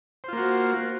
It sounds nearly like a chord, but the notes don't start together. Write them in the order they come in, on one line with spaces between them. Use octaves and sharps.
C5 F4 A#3 F#4